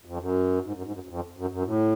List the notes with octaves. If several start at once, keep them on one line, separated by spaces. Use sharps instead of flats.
F2
F#2
G#2
F#2
G#2
F#2
F#2
F2
F#2
F#2
A2